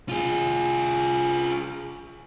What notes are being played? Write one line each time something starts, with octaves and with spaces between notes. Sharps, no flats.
F4 G#4